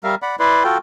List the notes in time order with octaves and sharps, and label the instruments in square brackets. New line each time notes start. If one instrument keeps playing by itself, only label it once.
[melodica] G3 A#4 E5 F5
D5 F#5 B5
E4 B4 D5 C6
F4 F#4 A4 G5